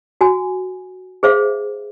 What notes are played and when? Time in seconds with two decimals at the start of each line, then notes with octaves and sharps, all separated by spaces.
0.21 F#4 G#5
1.23 G#4 C5 E5 F5